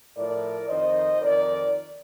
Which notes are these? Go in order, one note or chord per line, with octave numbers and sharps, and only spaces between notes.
A2 F3 A#4 D5
F2 D#3 C5 D#5
F2 D#3 A#4 D5